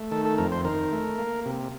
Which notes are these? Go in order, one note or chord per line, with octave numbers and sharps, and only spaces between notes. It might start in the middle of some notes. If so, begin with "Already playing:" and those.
Already playing: A3
D#3 A4
A4
F2 A#4
C5
D#3 A#4
A3
A#3
C3